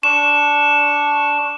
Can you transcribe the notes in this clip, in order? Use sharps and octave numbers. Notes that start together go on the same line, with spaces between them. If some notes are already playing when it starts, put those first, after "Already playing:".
D4 C#6 E7